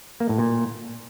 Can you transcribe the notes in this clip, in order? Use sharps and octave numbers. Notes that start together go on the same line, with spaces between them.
A#3
A2
A#2